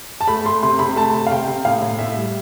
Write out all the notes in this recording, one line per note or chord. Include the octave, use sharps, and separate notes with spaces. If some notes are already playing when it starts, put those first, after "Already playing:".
A5
A3 B5
A3 C6
C3 C6
C3 B5
A3 A5
C3
F5
C3 G5
C3
A2 F5
A2
A2 E5
G3